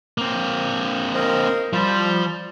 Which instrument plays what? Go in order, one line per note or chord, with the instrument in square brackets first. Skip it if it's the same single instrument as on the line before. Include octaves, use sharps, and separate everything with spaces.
[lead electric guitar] A#3 C4
[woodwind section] A#4 C5 D#5
[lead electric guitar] F3 C5 [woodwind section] G3